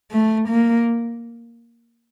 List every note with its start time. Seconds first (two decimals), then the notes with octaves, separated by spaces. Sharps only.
0.11 A3
0.49 A#3